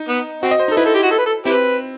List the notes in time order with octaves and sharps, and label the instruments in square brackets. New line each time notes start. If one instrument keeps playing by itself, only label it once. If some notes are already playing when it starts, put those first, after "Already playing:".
Already playing: [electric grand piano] D#4
[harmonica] B3
[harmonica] C4 [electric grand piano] F#4
[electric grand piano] D#5
C5
D#4
[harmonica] A4
[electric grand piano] E4 [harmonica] B4
[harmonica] A4
G4
F#4
A4
B4
A4
[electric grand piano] C4 [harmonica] E4 G4 B4